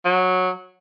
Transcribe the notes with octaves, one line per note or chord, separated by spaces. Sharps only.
F#3